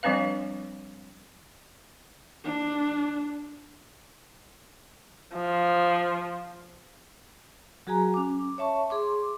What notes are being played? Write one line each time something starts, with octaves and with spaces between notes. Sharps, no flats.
F3 G3 C4 D4 B4 F5
D4
F3
F#3 F#4 G#4 G#5 A#5
C#4 D6
C#5 E5 A5 C#6
G#4 C6 D6